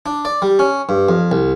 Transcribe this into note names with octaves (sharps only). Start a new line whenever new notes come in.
D4
D5
G3
C#4
G2
F2
C2